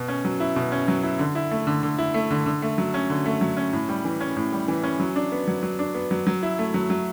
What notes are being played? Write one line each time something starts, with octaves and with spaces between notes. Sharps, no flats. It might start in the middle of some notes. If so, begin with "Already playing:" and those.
Already playing: B2
C#4
F#3
E4
B2
C#4
F#3
E4
D3
E4
A3
D3
D3
E4
A3
D3
D3
A3
F#3
C#4
D3
A3
F#3
C#4
A2
G3
E3
C#4
A2
G3
E3
C#4
F#3
D4
B3
F#3
F#3
D4
B3
F#3
F#3
E4
A3
F#3
F#3